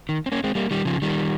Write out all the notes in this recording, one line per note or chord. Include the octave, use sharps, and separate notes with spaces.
D#3
C4
A#3 C#4
G#3 C4
G3 A#3
D#3 G3
C#3 F3
D#3 G3